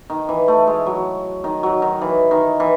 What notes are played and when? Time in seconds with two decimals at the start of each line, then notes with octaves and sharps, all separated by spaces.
0.10 D#3
0.29 E3
0.48 A3
0.67 G#3
0.86 F#3
1.44 D#3
1.63 F#3
1.82 D#3
2.02 E3
2.31 D#3
2.60 E3